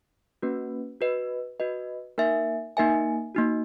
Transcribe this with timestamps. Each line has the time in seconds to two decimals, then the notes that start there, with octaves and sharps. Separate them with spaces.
0.42 A#3 C#4 F#4 B4
1.01 F#4 B4 D#5
1.60 F#4 B4 D#5
2.18 A#3 D#4 A#4 E5 G#5
2.77 A#3 D#4 A#4 E5 G#5
3.35 A#3 D#4 F#4